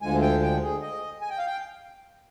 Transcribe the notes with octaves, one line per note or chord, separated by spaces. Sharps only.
D2 D3 F3 G#3 G#5
G5
G5
G#4
D#5
G#5
G5
F5
G5